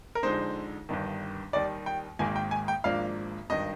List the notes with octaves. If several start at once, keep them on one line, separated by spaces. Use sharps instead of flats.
A#4
F2 D3 G#3 D#4 C5
G1 G2 D#3
D#2 D#3 G3 D5
G5
G#1 G#2 D#3 A#3 G#5
G5
G#5
G5
G#1 G#2 F3 A#3 D4 F5
G#1 G2 D#3 D#5